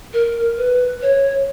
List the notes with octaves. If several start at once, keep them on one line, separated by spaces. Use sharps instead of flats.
A#4
B4
C#5